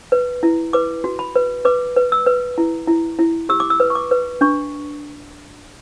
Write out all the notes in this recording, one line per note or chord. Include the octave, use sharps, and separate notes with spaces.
B4
E4
B4 D6
F#4
B5
B4
B4 D6
B4
E6
B4
E4
E4
E4
G4 E6
D6
E6
B4
C#6
D6
B4
D4 C#6